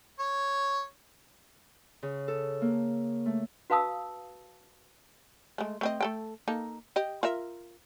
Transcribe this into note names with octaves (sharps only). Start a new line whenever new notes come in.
C#5
C#3
A4
A#3
A3
F#4 B4 F5 A5 D#6 E6
G#3 A3
A3 C4 D#5
A3 A4 G5
A#3 D#4 A4
G4 D#5
F4 A#4 E5